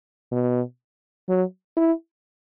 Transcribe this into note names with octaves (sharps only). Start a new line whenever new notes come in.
B2
F#3
E4